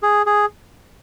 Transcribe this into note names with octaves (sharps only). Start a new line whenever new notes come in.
G#4
G#4